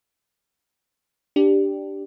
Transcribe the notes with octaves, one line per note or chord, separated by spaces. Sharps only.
D4 G4